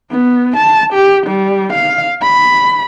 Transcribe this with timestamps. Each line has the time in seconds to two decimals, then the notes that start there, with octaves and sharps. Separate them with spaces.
0.11 B3
0.57 A5
0.93 G4
1.27 G3
1.73 F5
2.22 B5